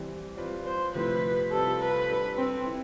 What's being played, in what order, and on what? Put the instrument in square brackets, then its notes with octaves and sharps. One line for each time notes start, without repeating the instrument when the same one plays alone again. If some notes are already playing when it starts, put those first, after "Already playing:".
Already playing: [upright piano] E3 G3 C4
G3 C4 F4 B4
[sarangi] C5
[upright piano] C3 F3 A3 E4 [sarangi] B4
[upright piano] C3 G3 C4 F4 [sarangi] A4
[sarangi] B4
[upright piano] G3 D4 A4
[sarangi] C4
[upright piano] C4 E4